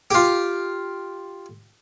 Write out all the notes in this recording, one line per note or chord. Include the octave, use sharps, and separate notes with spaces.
F4 G4